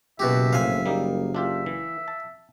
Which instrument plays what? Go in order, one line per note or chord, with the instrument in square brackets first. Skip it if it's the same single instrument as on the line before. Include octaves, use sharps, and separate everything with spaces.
[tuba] F#1 [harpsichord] B2 F#4 G4 [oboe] E5
[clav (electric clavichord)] A#1 A2 C4 [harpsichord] F5 G#5
[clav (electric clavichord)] G3 A#3 D#4
[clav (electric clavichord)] D4 F4 G4 [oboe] E5
[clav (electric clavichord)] E3
A5